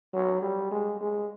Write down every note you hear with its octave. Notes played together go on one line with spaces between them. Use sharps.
F#3
G3
G#3
G#3